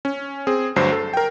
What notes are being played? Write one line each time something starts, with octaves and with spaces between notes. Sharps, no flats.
C#4
C4 G#4
D2 G2 F#3 C5 C7
A4
A#4 G5